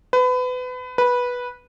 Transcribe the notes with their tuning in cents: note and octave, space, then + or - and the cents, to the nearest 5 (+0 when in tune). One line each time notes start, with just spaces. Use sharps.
B4 +30
B4 -10